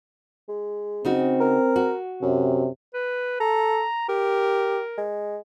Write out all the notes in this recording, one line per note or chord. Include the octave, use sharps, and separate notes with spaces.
G#3
C#3 C4 D#4 F#4
A#4
F#4
F#2 C3
B4
A4 A#5
G4 A#4
G#3